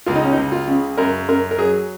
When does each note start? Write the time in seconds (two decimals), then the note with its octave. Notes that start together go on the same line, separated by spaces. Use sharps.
0.06 C#2 F4
0.15 D#4
0.24 C#4
0.32 D#4
0.37 C#2
0.52 F4
0.68 C#3
0.98 F#2 A#4
1.29 F#2 A#4
1.51 A#4
1.59 F#3 G#4